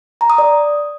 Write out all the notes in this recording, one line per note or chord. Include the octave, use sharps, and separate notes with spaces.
A#5
D#6
D5